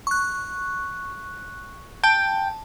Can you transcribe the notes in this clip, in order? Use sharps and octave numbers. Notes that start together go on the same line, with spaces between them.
C#6 F#6
G5 A5